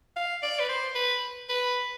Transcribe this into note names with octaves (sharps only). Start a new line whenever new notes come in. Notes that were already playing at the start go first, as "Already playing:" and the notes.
F5
D5
B4
C5
B4
B4